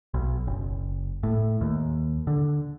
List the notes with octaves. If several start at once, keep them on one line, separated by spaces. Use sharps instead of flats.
B1
F#1
A2
D#2
D3